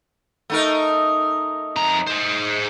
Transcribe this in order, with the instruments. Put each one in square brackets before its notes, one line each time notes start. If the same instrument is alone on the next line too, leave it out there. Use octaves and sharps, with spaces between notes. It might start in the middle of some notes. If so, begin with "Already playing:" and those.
[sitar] A3 D#4 A#4
[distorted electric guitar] F2 A#5
G#4 C5